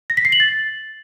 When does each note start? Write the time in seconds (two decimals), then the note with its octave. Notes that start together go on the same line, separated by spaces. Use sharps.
0.10 A#6
0.17 B6
0.25 C7
0.32 F#7
0.40 A6